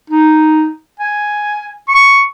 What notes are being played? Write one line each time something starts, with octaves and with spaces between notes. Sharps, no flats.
D#4
G#5
C#6